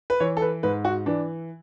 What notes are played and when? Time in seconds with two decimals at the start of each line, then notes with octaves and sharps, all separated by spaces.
0.10 B4
0.20 E3 C#5
0.37 A4
0.42 B4
0.63 G#2 B4
0.85 F#4
1.06 E3 D4